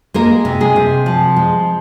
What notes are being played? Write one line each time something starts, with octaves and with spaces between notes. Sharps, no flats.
G#3 A#3 A#4
C3
G#3 G#4
C3
F3
G#3